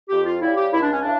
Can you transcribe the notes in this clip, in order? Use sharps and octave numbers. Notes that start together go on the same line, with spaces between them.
F2 G4
F4
C#3 G3 E4
G4
C#2 E4
D4
C#4
C#3 E3 D4